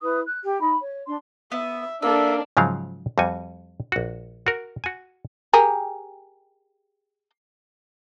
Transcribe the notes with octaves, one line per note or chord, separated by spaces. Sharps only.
E4 B4 D#6
F#6
G4
D#4 B5
C#5
D4 C6
B3 E5
A#3 D4 A4 E5
G#2 C#3 F3 F#3 F5
F2 G3 F#4 G#5
A#1 F#4
F#4 A#4
F#4 G#5
G4 G#4 A#4